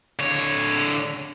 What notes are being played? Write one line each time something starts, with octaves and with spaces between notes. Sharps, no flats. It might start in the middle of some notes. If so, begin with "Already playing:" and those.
D3 C#5